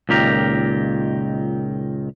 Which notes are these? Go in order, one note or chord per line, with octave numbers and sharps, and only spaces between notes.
C#2 A#2 D#3 G4 A#4